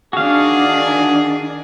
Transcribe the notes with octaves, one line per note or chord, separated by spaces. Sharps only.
D#3 D4 F#4 G#4 F5